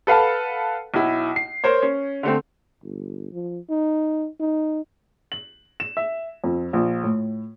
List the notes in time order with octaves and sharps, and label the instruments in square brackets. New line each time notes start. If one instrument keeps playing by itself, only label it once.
[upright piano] A4 B4 F5 F#5 A5
B1 E4
C7
A#4 C5 C#5
C#4
D3 A3 C4
[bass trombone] G1
F3
D#4
D#4
[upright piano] F#7
E7
E5
F2
A#1
A2